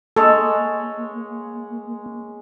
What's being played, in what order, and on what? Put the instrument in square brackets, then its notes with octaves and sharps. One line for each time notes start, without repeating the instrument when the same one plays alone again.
[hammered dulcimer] G#3 C#5 [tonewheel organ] A#3 [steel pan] A4